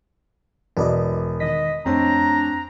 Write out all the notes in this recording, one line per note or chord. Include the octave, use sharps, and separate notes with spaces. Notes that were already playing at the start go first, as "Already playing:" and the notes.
E1 B4 D5 D#5
D#3 D#5 B6
F2 A3 C4 D4 C#5 A#5